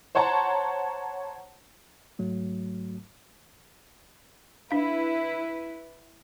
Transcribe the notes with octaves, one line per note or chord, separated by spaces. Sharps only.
C5 C#5 F#5 A5 A#5 C6
G#2 F#3 A3
D4 E4 B4 F5